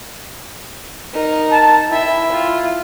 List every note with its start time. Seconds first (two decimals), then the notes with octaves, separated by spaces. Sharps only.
1.13 D#4 A#4
1.52 A5
1.90 E4 E5 G5
2.32 F4